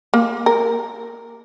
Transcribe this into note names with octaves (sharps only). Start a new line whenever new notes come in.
A#3
A#4